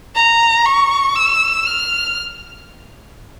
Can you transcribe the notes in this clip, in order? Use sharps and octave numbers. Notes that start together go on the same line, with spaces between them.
A#5
C#6
E6
F6